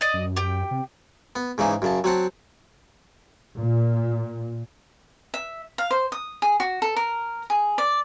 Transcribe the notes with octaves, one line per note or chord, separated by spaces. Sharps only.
D5 D#5
F#2
G4 G5
C3
B3
G#2 C#3 E3 D#4
F#2 C#3 A5
F#3 C4 F#5 A5
A#2
E5
F5
C5
D#6
G#4
F#4
A4
A#4
G#4
D5